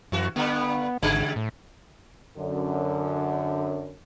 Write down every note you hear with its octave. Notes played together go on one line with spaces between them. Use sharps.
F#2 E3 F#4
G2 D3 B3
G#1 C#3 G3 G#3
A2
F#2 D3